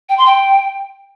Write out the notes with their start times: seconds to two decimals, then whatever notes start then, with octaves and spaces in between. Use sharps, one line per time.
0.09 G5
0.18 C6
0.26 G5